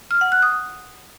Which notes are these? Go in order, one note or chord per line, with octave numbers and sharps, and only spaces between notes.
F6
F#5
F#6
D#6